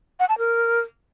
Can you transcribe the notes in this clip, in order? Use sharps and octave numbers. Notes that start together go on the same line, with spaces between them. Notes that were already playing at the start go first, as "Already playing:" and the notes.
F#5
A5
A#4